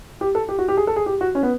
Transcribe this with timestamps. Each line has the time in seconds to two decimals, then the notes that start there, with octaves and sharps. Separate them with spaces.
0.21 G4
0.35 A4
0.49 G4
0.59 F#4
0.68 G4
0.77 G#4
0.87 A4
0.96 G#4
1.06 G4
1.21 F#4
1.35 C#4
1.43 B3